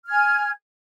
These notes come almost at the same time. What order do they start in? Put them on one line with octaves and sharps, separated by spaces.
F6 G#6 G#5